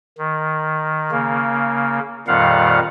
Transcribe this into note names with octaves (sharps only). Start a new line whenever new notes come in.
D#3
C#3 A#3
F2 A#2 D#3 G3 F5 F#5